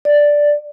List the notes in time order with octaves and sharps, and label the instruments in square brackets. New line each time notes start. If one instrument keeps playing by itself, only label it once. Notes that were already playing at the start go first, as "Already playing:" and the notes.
[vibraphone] D5